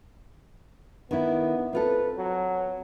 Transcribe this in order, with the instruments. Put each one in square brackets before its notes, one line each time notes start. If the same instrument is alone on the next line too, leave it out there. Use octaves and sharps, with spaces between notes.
[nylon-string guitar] D#3 D4 E4 [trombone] B3
[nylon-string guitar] C4 F4 A4 [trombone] B4
[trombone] F#3